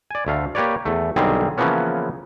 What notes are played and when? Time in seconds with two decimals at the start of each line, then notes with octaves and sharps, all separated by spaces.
0.11 D5 G#5
0.27 D2 A3 F5
0.55 A#3 G4 B4 C#5 D5
0.85 E2 A3
1.16 B1 D3 D#3 G3 C4 G#4
1.58 C#3 E3 F3 A#3 B3 C#4